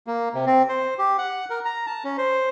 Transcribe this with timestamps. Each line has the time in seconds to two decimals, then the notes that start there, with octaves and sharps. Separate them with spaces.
0.07 A#3
0.34 C3
0.46 C4
0.69 C5
0.99 G4
1.18 F#5
1.50 A#4
1.65 A#5
1.87 A5
2.04 C#4
2.18 C5